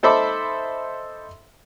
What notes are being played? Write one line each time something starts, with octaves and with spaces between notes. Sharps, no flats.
D#4 A4 C5 E5 B5 D6